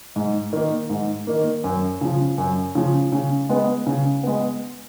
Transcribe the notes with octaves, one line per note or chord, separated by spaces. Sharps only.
G#2
D#3 A#3
G#2
D#3 A#3
F#2
C#3 F3
F#2
C#3 F3
C#3
G#3 B3
C#3
G#3 B3